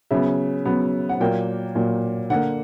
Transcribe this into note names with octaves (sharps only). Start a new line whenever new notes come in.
C#3 F#3 B3 E5
C#3 F#3 B3
F#5
A#2 F#3 A#3 G5
A#2 F#3 A#3
D3 A#3 F#5